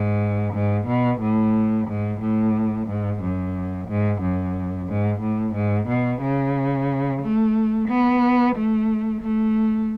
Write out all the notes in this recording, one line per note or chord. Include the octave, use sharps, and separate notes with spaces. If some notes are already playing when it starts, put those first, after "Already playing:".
Already playing: G#2
G#2
B2
A2
G#2
A2
G#2
F#2
G#2
F#2
G#2
A2
G#2
B2
C#3
A3
B3
A3
A3